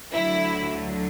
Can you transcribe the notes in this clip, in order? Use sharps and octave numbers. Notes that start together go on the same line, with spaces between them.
D2 D3 F#3 E4